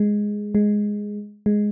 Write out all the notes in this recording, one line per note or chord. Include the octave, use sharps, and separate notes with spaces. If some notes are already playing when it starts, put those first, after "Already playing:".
Already playing: G#3
G#3
G#3